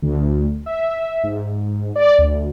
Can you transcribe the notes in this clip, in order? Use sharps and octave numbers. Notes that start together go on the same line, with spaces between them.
D2
E5
G#2
D5
D2